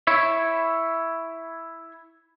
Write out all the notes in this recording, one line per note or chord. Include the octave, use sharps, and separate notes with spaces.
E4 C#5 E5